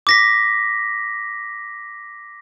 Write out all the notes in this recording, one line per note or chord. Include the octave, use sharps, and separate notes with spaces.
D6 A#6 B6